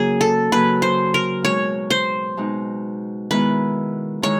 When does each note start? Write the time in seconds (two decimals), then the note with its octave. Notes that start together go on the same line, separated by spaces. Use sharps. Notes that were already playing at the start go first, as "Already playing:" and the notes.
Already playing: C#3 F#3 A#3 G#4
0.21 A4
0.52 C#3 F#3 A#3 B4
0.82 C5
1.14 A#4
1.42 B2 G#3 C4 D#4 C#5
1.90 C5
2.37 B2 G#3 C4 D#4
3.30 D#3 G#3 B3 E4 B4
4.22 D#3 G#3 E4 C#5